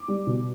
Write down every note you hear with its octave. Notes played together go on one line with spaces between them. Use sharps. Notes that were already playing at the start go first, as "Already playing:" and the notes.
Already playing: D6
G3
B2